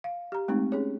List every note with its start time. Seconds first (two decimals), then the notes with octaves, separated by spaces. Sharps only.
0.04 F5
0.32 G4 A#5
0.48 G#3 A3 C4 D#4
0.72 C#4 G#4 C#5